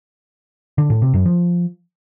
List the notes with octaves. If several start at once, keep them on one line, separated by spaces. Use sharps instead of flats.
D3
A2
C3
F#2
F3